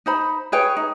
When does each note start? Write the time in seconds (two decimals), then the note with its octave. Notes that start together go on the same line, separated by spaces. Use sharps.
0.06 D#4 C5 B5
0.52 G#4 B4 C#5 G5
0.77 D#4